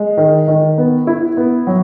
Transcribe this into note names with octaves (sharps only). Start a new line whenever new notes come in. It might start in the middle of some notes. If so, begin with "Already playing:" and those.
Already playing: G#3
D#3
D#3
B3
E4
B3
F#3